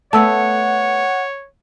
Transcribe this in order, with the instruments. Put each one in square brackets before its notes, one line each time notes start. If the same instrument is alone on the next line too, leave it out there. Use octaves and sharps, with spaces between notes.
[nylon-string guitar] A3 B3 [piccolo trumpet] C#5 [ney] F#5 [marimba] A5 E6